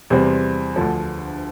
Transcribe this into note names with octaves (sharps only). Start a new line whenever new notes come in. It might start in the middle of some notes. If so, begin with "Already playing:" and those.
E2 C3 G3 C4
D2 D3 F3